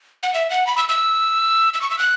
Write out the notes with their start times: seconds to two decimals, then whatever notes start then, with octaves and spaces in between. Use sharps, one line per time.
0.23 F#5
0.34 E5
0.50 F#5
0.67 B5
0.78 E6
0.89 E6
1.74 E6
1.82 C#6
1.90 E6
1.99 F#6